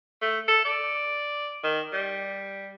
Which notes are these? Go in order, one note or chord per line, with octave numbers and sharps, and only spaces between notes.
A3
A4
D5
D#3
G3